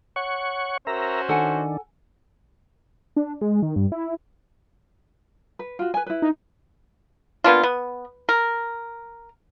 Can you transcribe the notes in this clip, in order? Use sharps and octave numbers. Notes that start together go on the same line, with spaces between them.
C#5 F#5 C#6
C#4 F#4 A#4 C5 E5 A#5
D#3 D4 A4 F#5 G#5
D4
G#3
D#3
G2
E4
B4
F4 F#4
B4 G#5
E4 B4
D#4
A#3 B3 D4 F4
B3
A#4